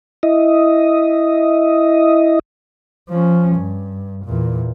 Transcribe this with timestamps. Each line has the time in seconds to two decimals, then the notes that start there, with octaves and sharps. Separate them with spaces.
0.23 E4 D#5
3.09 F3 C#4
3.56 G2
4.25 E2 A#2